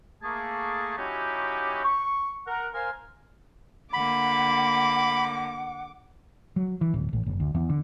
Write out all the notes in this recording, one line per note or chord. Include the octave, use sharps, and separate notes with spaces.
A3 A#3 G#4 A5
F#3 C#4 D#4 E4 F#4 G4
C#6
A#4 F#5
A#4 C5 F5 G#5
D3 A#3 F#5 B5 D6
F#3
E3
D1
A1
F#1
D2
E2
D3